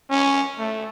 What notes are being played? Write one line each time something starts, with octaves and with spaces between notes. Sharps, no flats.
C#4
A3